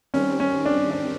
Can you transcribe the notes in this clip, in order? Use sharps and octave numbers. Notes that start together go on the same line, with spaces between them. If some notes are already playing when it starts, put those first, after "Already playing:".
D#3 G3 C4 C#4
C#4
D4
D4